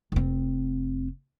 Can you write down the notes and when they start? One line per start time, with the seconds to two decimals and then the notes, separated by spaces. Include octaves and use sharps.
0.12 F1 C4